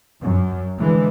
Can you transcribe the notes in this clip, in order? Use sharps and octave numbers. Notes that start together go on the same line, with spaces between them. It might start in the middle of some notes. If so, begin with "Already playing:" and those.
F#2
D3 E3 G#3